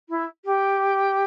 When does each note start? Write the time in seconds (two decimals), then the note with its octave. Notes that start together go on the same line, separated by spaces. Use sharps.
0.09 E4
0.44 G4